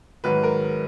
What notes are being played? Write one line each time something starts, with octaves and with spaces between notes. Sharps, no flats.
G#2 D#3 F#3 B4
A#4